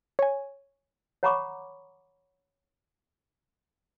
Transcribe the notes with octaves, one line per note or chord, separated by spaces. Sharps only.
C#5 G#5
C#5 F#5 A#5 B5 C#6 D6